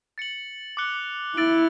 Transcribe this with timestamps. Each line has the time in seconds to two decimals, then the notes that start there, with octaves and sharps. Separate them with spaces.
0.18 A6 C#7 F#7
0.77 D6 F#6 C#7 G7
1.37 E4 E6 A6 D7 F#7